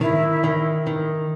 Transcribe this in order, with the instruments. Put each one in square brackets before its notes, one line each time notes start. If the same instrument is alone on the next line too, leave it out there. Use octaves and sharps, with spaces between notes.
[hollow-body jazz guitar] D#3 [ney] E4
[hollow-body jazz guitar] D#3
D#3